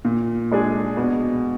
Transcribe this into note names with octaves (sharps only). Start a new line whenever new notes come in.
A#2
G#3 D4 G#4
B2